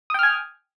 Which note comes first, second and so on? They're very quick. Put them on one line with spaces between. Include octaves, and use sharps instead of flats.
D#6 G5 F6 G#5